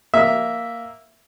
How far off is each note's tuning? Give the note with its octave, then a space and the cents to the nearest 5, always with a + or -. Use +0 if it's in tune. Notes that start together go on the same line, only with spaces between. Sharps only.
A#3 +0 E5 +0